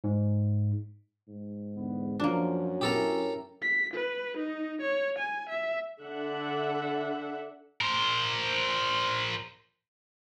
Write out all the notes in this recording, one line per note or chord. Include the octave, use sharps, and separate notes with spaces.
G#2
G#2
E2 D3 B3
F#2 F3 A#3 D4
C#4 E4 G4 A4 A#4
B6
B4
D#4
C#5
G#5
E5
D3 D4 E5 F#5
A#4 C5